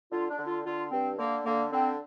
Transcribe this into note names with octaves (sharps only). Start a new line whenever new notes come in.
D3 F4
D4
D3
F4
D3 F4
G2 C4
D3 A#3
D3 A#3
D3 C4